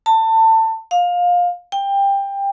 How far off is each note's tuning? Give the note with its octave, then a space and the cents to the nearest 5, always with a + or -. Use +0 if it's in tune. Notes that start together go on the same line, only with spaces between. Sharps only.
A5 +25
F5 +20
G5 +20